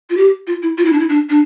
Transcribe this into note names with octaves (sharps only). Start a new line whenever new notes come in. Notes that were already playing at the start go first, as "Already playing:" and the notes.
F4
G4
F4
E4
F4
E4
D4
E4
D4
D4